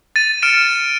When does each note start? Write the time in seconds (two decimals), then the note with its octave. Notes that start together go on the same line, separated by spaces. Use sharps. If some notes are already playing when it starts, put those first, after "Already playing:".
0.16 A6 D#7
0.42 F6 C#7 D7 E7